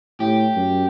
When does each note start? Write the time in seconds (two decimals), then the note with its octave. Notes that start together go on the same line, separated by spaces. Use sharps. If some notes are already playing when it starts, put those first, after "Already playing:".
0.20 A2 G4
0.56 F#2